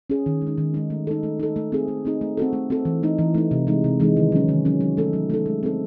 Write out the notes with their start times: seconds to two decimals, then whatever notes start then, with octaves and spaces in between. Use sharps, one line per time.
0.10 C#4 G#4
0.26 D#3
0.42 G#3
0.47 D#4
0.58 D#3
0.74 G#3 D#4
0.90 A3
1.07 D#4 A4
1.23 A3
1.40 D#4 A4
1.56 A3
1.72 C4 D#4 G#4
1.88 A3
2.05 C4 D#4 G#4
2.21 A3
2.37 C4 F#4 A4
2.53 A3
2.70 C4 F#4 A4
2.85 E3
3.03 A3 D#4
3.18 E3
3.34 A3 D#4
3.51 C3
3.67 E3 G#3 D#4
3.84 C3
4.00 E3 G#3 D#4
4.17 D#3
4.32 F#3 C#4
4.48 D#3
4.65 F#3 C#4
4.81 F#3
4.97 A3 D#4 A4
5.13 F#3
5.30 A3 D#4 A4
5.46 G#3
5.63 C4 D#4 A4